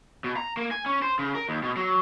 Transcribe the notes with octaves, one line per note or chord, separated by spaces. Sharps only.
B2
A#5
A#3
G#5
C#4
C5
C#3
A#4
D#2
B2
F#3